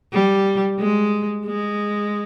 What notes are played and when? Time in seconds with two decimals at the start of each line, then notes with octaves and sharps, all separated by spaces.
0.13 G3
0.79 G#3
1.46 G#3